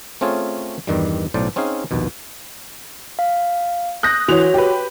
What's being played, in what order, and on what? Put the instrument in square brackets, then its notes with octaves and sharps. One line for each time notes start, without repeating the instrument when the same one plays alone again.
[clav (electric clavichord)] A3 C4 C#4 F4 G#4 C#5
E2 G2 D#3 G3
B1 A2 C5 D5
C4 C#4 D#4 G#4 F5
A#1 D#2 B2
[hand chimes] F5
[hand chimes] D#6 [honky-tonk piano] F#6 G6 A#6
[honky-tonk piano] E3 F7 [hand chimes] F#4 C#5
[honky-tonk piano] G4 B4